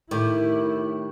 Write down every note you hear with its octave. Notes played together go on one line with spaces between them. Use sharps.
A2 D#3 E4 G4